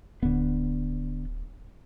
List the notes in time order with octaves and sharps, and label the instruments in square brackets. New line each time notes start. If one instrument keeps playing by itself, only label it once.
[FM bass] D1 [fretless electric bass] D3 B3